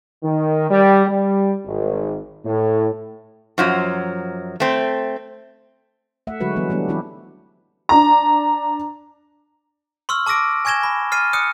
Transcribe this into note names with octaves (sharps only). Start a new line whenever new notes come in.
D#3
G3
G3
G#1
A2
F#2 F3 F#3
A3 C4
A3 E5 F#5
D3 F#3 G#3 F#4 B4
E3 F#3 G3 B3
E3 G3 A3 B3 D4
E3 C4 E4 G4
D4 A#5
C6 C#6 E6 F6
A5 D6 E6 A#6 D7
G#5 C#6 G#6 A#6 E7 G7
B5
F6 A6 C7 D#7
D#6 F#6 C#7